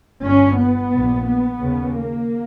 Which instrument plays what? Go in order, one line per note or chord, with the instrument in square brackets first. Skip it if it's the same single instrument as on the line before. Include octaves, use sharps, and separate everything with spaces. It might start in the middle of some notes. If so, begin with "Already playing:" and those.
[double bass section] G1 G2 C#4
B3
A#1 A#2
B3
D#2 C#3
A#3